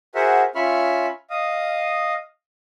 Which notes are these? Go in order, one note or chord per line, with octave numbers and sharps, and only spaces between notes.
F#4 G#4 A#4 C5 E5 F#5
C#4 F4 E5 B5 C#6 F6
D#5 F5 D#6